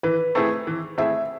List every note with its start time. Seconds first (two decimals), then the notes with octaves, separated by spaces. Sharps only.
0.03 E3 B4
0.35 A3 C4 E4 G#4
0.67 E3
0.98 A3 C4 E4 G#4 E5